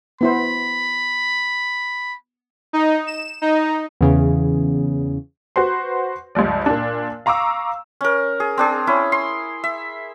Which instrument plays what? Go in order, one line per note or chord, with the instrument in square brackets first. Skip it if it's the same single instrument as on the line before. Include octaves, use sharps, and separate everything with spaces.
[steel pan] B3 E4 C5 [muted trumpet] B5
[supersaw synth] D#4
E7
D#4
[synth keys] E2 C#3
[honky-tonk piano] F#4 B4 C5 C6
C#2 G2 F3 D5
A#2 D4
F5 A#5 C#6 D6 E6
[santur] C#4 A#4
G#4
C4 D4 G#4
C#4 E4
C6
E5